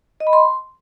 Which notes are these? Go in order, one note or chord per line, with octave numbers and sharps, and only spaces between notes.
D#5
B5
C6